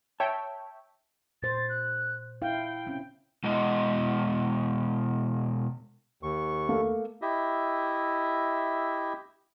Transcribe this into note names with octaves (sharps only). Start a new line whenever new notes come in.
C#5 E5 G5 A5
A#2 C5 A6
F#6
E4 F5 G5
C4 C#4
B2 G#3 E4 D#5
D#2 C#6
A3 A#3
E4 G4 D#5 E5